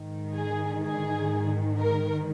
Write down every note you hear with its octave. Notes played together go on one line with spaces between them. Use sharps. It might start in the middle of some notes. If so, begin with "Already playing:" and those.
Already playing: G#2 D#3
G#4
G#4
A#4